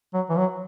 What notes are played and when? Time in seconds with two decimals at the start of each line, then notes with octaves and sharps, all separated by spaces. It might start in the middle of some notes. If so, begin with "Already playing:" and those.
0.14 F#3
0.29 E3
0.38 F#3